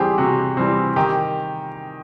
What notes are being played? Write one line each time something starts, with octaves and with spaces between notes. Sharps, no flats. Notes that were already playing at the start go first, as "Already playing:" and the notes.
Already playing: E3 G3 C4 G4 G#4
C3 F#4
E3 G3 C4
D#3 G4